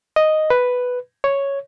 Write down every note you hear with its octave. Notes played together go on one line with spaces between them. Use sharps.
D#5
B4
C#5